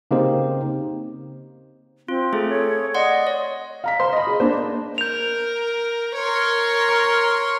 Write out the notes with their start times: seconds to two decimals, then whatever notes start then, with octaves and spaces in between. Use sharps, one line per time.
0.11 C#3 A#3 C4 D#4 G4 C5
2.08 C4 F4
2.33 A3 G#4 A4
2.49 C#5
2.94 D5 D#5 F#5 C6
3.27 C#5
3.84 F5 A#5 B6
4.00 C5 C6
4.13 D#5 B5
4.27 G#4
4.40 A#3 D4 C5
4.98 A#4 G6 F7
6.16 A#4 C#5 C6
6.89 C#6